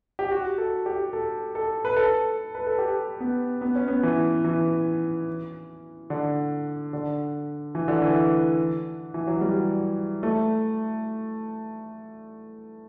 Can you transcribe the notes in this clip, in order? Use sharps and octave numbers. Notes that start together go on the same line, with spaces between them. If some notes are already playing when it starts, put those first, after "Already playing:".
G4
F#4
A4
G4
A4
A4
B4
A4
B4
A4
G4
B3
B3
C#4
B3
E3
E3
D3
D3
E3
D3
E3
E3
F#3
G3
A3